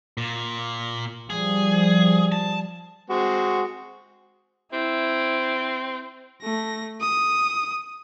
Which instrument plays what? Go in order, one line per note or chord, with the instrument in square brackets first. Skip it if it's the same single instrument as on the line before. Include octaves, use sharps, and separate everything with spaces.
[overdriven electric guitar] A#2
[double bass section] F3 G3 [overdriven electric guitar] G#4
[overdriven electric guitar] A5
[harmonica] G#3 C4 F#4
[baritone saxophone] C4 [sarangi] E4
[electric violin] A3 A#6
D#6